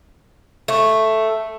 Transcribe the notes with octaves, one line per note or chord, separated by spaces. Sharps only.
A3